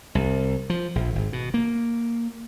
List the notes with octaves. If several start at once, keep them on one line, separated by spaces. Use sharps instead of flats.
C2
F3
A#1
G#1
B2
A#3